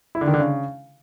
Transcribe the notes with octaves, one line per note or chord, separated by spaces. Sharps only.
E4
D3
D#3
D3
C#3